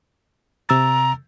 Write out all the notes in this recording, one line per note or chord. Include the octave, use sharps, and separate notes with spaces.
C3 A#5 E6 A6